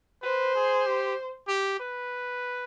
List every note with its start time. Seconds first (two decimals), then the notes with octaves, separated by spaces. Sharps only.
0.22 B4 C5
0.55 G#4
0.86 G4
1.48 G4
1.80 B4